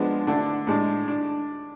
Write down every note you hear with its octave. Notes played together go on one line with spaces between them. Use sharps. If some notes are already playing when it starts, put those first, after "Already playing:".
Already playing: F3 G#3 B3 D4
D3 A3 D4
A2 G#3 D4
D4